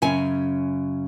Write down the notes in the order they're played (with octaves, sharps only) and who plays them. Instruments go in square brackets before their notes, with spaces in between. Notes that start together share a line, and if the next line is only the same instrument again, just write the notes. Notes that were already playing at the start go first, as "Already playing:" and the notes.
[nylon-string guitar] F#2 C#3 G#5